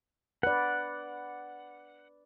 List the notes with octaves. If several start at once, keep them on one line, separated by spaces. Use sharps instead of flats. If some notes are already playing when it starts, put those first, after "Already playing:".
B4 D5 F#5